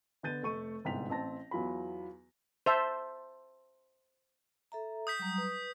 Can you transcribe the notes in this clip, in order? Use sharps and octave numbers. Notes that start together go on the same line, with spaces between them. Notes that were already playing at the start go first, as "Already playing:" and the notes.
D3 B3 G6 A6 D#7
F1 A3 C#6 D#7
G1 C2 G#2 G5 B6 F7
A1 C4 A5 A#6
E2 F#3 F4 B5
C5 E5 A5
A4 E5 A#5
D#6 G6 B6
F#3 G3 A#5
B4